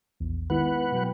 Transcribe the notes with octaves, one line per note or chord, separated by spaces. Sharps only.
A#1 E2
D#3 G#3 B3 E4 B4 F#5
B2 F#3 G5